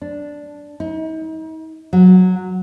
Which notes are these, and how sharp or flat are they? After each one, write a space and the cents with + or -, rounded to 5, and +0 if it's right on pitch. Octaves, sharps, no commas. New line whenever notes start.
D4 -5
D#4 +40
F#3 -10